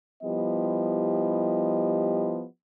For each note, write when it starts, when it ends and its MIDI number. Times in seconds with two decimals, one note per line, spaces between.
0.23 2.44 53
0.23 2.44 55
0.23 2.44 59
0.23 2.44 64
0.23 2.44 67
0.23 2.44 75